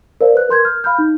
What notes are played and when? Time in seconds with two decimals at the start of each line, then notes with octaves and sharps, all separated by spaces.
0.21 A#4 C5 D5 F5
0.34 B4 F#6
0.49 A#4 C6 G6 G#6
0.65 F6
0.84 F5 B5 F6 G6
0.98 D#4